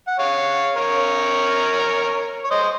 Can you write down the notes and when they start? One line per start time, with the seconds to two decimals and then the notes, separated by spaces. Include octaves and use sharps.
0.07 F#5
0.19 C#5 F5
0.76 A#4 C#5
2.44 C#5
2.50 C5 D#5
2.63 D#5